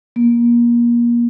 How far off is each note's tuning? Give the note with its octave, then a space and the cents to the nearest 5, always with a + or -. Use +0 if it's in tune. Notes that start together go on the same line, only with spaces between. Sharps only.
A#3 +30